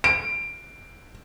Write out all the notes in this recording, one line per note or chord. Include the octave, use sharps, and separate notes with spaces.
D7